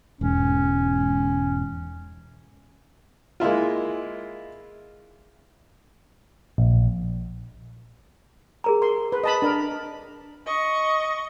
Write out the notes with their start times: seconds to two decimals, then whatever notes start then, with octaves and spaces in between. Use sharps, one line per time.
0.21 E1 G#2 C#4
3.40 G#3 A#3 E4 F4
6.58 A#1
8.64 G#4 A#4 A#5
8.82 A#4 C6
9.12 B4
9.24 D#5 A5 B5
9.42 D4 A#4
10.46 D#5 C#6